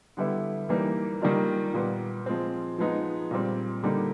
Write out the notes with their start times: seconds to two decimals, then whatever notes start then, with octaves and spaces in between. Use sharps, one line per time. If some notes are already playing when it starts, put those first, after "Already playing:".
0.17 D3 G3 B3 E4
0.69 E3 G3 A#3 D#4
1.22 D#3 G3 A#3 D4 F4
1.74 A#2 G3 B3
2.26 F3 G#3 C4
2.78 F3 G#3 B3 D#4
3.31 A#2 G3 C4
3.83 D3 G3 A#3 D#4